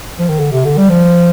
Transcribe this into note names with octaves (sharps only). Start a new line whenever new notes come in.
F3
D#3
D3
C3
D3
G3
F3